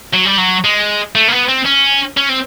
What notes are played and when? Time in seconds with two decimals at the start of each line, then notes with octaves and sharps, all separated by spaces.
0.14 F#3
0.26 G3
0.38 F#3
0.64 G#3
1.15 A3
1.28 A#3
1.32 B3
1.49 C4
1.65 C#4
2.17 C#4
2.29 C4